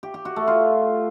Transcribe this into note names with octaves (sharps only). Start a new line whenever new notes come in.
G4
G4
F#4
A3
F4